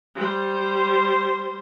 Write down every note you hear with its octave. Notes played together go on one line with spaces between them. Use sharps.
G3 C5